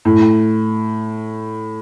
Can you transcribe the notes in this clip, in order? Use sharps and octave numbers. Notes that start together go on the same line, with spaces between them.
A2